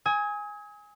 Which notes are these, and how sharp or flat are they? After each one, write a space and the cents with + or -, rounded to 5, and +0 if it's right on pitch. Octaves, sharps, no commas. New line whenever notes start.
G#5 -5 D#6 +40